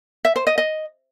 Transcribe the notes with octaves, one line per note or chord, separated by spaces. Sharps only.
E5
C5
D#5
D#5